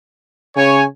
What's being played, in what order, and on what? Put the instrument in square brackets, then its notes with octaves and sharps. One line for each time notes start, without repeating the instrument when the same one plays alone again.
[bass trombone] C#3 [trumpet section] C#5 G#5